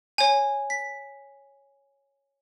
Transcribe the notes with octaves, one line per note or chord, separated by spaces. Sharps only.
C#5 G#5
B6